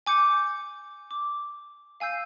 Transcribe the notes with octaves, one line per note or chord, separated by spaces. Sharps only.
G#5 D6 G6 C#7
D6
F5 G#5 E6 G6 C7